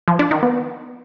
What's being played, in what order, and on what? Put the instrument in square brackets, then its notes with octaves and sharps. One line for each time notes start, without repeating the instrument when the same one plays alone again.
[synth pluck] F3
D4
D#3
B3